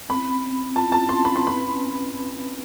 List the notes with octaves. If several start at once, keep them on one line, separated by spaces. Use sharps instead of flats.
C4 B5
C4
F4 A5
A5
C4 C6
B5
C6
B4
B5
C#4